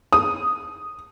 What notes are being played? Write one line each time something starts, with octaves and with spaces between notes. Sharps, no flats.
D#6